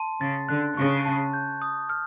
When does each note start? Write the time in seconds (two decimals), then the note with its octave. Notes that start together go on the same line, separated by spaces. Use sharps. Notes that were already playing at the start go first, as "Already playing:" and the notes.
Already playing: A5 C6
0.20 C#3 A6
0.49 D3 F#6
0.77 C#3 C#6
1.06 A5
1.33 G6
1.62 D#6
1.89 F6